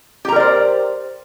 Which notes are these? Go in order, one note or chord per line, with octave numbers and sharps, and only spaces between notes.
G4 A#4 C5 D5 A#5